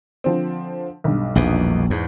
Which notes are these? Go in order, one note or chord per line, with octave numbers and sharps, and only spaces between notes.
D3 F3 C4
B1 G2
A#1 E2 B2
E2 G#2